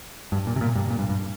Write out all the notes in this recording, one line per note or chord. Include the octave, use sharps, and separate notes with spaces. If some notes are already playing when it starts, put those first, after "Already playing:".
G2
A#2
C3
A#2
G2
A#2
G2
G2